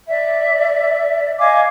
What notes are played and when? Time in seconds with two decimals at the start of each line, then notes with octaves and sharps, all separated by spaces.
0.08 D5 E5
1.38 D#5 F5 G#5 D6